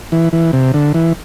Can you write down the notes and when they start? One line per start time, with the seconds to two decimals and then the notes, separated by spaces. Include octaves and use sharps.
0.12 E3
0.33 E3
0.53 C3
0.74 D3
0.94 E3